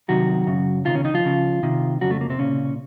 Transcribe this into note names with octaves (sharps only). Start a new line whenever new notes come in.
C2 C3 D#3 F#3 F#4
F#2 C#3
C#2 C3 D#3 F3 F4
C#3 C#4
D#3 D#4
F3 F4
C#2 C#3
C2 C3 D#3
F2 C#3 F#3 F#4
A3
A#3
C3 C4
C2 A#2 C#3 C#4